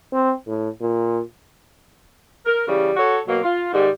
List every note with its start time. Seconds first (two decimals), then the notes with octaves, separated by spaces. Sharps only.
0.13 C4
0.47 A2
0.81 A#2
2.45 A#4
2.68 C#3 E3 G3
2.96 F#4 A4 C#5
3.28 B2 F#3 A#3
3.43 F4
3.73 G#2 D#3 G3